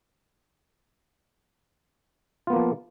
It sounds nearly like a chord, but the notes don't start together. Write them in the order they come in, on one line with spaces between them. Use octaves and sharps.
F4 B3 A#3 F3